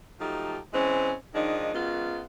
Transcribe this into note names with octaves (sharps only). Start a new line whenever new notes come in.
F3 F#3 A3 D#4 G4
E3 G#3 C4 C#4 C5
D#3 F3 G#3 D4 D#4
F#2 F#3 G#3 B3 F4